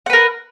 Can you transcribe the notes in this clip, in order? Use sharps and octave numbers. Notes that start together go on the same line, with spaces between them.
A#4 B4 F#5